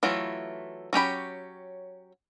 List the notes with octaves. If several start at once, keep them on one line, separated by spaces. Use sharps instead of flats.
E3 F#3 A3 E4 F4
F#3 C#4 G4 B5